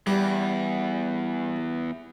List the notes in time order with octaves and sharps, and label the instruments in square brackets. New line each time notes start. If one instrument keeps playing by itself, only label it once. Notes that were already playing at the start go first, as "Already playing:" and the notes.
[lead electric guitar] E2 [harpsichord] G3